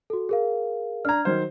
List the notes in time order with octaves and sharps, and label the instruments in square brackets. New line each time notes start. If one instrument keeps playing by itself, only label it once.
[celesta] F#4 A4
G#4 A#4 F5
[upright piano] D4 A#5 [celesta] F6 G#6
[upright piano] D#3 F#3 C5